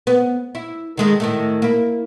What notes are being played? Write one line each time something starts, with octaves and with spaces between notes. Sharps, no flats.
B3
E4
D#3 G#3 A3
A2 D#3 A3
A#3 E4